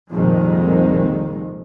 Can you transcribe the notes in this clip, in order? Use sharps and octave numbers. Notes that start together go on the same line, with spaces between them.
C2 F2 A#2 D#3 G#3